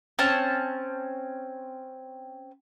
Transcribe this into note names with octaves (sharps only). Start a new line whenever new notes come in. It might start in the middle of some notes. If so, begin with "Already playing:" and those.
C4 C#4 A5